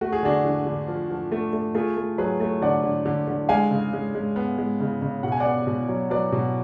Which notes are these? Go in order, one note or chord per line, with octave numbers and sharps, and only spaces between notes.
A3 F#4
G#4
D3 D4 F#4
D3
D3
F3
F3
A3
A3
A3 F4 G#4
A3
F#3 G#4 B4
A3
D3 D5 F#5
D3
D3
D3
G#3 F5 G#5
C#3
G#3
G#3
B3
G#3
C#3
C#3
B2 F#5
G#5
D5 F#5
B3
B2
F#3
F#3 B4 D5
B2